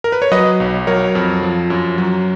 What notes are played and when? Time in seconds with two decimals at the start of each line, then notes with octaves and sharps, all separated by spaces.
0.04 A#4
0.12 B4
0.22 C#5
0.32 F#3 B4 D#5
0.60 B1
0.87 F#3 A#4 C#5
1.15 F2
1.43 F3
1.70 F#2
1.98 F#3